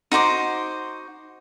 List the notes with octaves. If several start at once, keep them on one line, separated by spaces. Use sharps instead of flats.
D#4 F#4 C5 D6